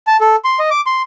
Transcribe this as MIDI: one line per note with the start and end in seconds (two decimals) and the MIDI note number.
0.07 0.17 81
0.21 0.36 69
0.44 0.59 84
0.59 0.70 75
0.71 0.81 86
0.86 1.02 84